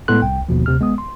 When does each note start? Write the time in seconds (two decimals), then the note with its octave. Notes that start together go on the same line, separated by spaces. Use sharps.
0.08 A2 G#3 B3 A4 C6 F#6
0.22 C2 G5
0.49 G1 D#2 B2 F3
0.66 D2 C3 F6
0.80 G#1 G#3 B3 D#6
0.98 C6